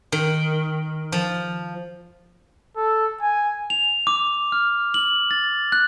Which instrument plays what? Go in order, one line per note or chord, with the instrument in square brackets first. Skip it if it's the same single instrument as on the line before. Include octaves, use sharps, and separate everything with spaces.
[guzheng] D#3
F3
[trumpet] A4
G#5
[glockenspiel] F7
D6
F6
F#7
A6
F#6